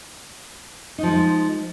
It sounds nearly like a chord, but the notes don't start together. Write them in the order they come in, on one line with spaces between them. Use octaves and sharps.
D#4 F3 G#3